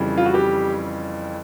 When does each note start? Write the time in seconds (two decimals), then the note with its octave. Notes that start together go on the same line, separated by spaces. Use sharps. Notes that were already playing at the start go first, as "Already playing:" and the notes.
Already playing: F2 C#3 E3 G3
0.17 F4
0.26 F#4
0.34 G4